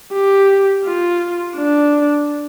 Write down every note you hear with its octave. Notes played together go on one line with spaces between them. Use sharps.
G4
F4
D4